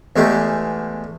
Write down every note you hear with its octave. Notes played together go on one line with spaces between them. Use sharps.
E2 G#3 A3 G4